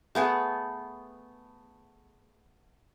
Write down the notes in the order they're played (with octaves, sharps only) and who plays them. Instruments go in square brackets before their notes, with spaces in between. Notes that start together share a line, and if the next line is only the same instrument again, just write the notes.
[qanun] A3 B3 G#4